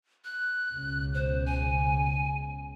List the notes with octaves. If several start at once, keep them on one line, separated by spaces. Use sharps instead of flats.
F#6
C#2 B2
C5
G#5